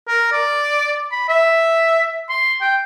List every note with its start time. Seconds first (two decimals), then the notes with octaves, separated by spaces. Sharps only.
0.08 A#4
0.32 D5
1.12 B5
1.28 E5
2.29 C6
2.61 G5